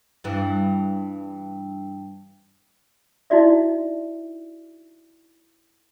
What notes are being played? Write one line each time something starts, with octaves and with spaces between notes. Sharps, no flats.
G2 E3
D#4 E4 F#4 D5 E5